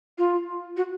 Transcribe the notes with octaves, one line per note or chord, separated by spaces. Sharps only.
F4
F#4